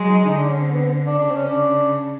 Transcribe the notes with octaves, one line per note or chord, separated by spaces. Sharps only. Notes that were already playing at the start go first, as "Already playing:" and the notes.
Already playing: F#3 G#3
D#4
D3 D#4
D4
C#4
C4
B3
C4
D4
C#3 D4
C4
C#4
D4